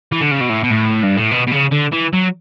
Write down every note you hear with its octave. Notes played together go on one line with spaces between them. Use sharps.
E3
D3
C#3
B2
A2
B2
A2
G2
A2
B2
B2
C#3
D3
E3
F#3